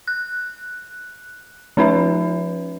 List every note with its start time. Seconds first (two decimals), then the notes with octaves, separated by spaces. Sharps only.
0.08 F#6
1.77 F3 C#4 D#4 B4 E5